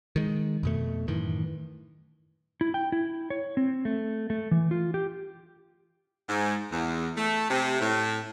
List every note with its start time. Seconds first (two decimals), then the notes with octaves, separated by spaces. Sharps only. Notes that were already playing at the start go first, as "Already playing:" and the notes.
0.16 D#3 G#3
0.63 F2 B2 A3
1.08 F#2 A2 D#3 E3
2.61 E4
2.74 G5
2.92 E4
3.30 C#5
3.57 C4
3.85 A3
4.30 A3
4.51 E3
4.71 F4
4.94 G4
6.29 G#2
6.72 E2
7.17 A3
7.50 C3
7.80 A2